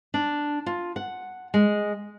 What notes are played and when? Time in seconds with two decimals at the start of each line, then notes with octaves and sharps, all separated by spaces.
0.14 D4
0.66 F4
0.96 F#5
1.54 G#3